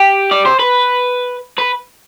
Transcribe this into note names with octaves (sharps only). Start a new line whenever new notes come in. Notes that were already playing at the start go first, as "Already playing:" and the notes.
Already playing: G4
D5
C5
B4
B4